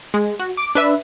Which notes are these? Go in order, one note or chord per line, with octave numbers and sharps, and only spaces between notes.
G#3
F#4
D6
D4 B4 E5